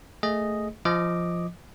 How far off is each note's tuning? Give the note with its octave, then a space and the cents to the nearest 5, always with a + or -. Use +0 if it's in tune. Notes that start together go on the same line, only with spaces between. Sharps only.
A3 +10 G#4 +0 D#5 +0
F3 -10 D#5 +0 D6 +5